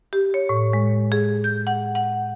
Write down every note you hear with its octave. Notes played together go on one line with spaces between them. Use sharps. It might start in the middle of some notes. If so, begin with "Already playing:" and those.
G4
C#5
A2
G#3
G#4
G6
F#5
F#5